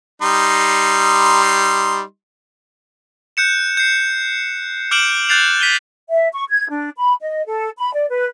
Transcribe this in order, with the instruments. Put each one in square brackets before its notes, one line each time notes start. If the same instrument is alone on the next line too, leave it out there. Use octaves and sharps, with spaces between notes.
[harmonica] G3 D#4 C6
[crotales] F#6 G6 C#7 E7
G6 C7
D6 F6 G6 D7 E7 F#7
F#6 G6 A6 C7 F7
B6 D#7 G7
[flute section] E5
C#6
G#6
D4
B5
D#5
A4
B5
D5
B4